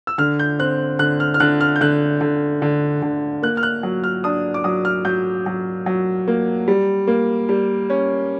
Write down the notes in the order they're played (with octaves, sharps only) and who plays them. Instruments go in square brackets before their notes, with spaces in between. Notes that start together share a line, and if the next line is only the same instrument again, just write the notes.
[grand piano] E6
D3 F6
G6
C4 F#6
D3 F#6
F6
F6
D3 F#6
F6
G6
D3 F#6
D3
D3
D3
A#3 F#6
F6
F#6
F#3
F6
D4 D#6
D6
F#3 D#6
F6
F#3 G6
F#3
F#3
A#3
G3
A#3
G3
C#4